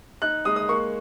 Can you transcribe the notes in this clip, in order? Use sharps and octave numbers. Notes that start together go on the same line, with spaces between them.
D#4 F#6
G#3 D#6
D#6
A#3 C#6